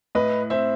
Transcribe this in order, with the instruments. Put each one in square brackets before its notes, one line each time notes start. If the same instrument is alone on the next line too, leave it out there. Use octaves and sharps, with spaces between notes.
[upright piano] A2 [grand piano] B4 D#5
[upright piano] C4 [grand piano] C5 E5